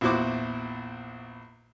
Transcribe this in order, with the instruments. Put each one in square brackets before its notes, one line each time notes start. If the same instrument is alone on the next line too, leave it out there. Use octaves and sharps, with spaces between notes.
[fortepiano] A#1 E2 E4 F#4 C5 D6